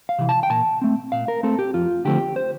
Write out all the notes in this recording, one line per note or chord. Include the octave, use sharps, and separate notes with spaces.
F5
C3 E3
A5
G5
A#2 A5
A3 C4
A#2 F5
A#4
A3 C4 A4
G4
F2 F4
D3 F3 A3 C4 G4
C5